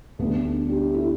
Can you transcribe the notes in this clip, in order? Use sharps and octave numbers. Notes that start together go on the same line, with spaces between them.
D2 D3 G3 B3
D4
D4 G4
E4 A4